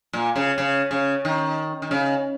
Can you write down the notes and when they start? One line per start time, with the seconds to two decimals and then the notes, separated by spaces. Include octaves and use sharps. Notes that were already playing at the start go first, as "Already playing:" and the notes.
0.13 A#2
0.36 C#3
0.58 C#3
0.91 C#3
1.25 D#3
1.82 D#3
1.91 C#3